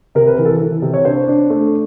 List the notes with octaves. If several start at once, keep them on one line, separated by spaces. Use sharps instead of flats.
C3 A#4
B4
E3 A#4
A4
E3
C3
C#5
D4 C5
D4
A3